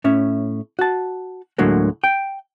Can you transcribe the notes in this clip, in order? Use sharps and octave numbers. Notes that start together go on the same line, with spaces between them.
A2 C#4 E5
F#4 A5
D2 A2 D3 F#3 G#3 A#3
G5